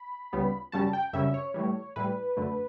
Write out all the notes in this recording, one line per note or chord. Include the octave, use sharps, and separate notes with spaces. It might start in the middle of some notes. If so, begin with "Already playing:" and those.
Already playing: B5
C#2 C#3 G3 B3
F#2 C#3 G3 C#4 A5
G5
F#2 C#3 G3 C#4 E5
C#5
A2 E3 G3
A2 E3 G3 B4
F#2 D3 A3